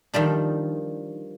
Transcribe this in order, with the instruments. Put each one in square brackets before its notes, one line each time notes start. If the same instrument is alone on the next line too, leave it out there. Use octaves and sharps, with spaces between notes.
[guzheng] D#3 F3 G3 D4